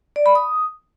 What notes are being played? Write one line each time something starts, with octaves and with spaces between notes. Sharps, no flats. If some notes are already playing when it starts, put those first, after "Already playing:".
D5
B5
D#6